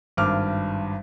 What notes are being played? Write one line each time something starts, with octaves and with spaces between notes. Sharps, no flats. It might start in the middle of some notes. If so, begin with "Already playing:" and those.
G#1 G2 D6 F6